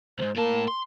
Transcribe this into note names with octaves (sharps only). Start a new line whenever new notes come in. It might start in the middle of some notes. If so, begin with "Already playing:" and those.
C2 G#2 C5
A2 A#3 A5
C6